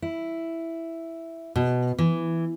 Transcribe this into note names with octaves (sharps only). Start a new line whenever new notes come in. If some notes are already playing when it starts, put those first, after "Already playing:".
E4
B2
E3